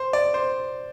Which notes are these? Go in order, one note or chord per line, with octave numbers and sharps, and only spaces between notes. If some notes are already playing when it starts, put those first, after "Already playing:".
Already playing: C5
D5
C5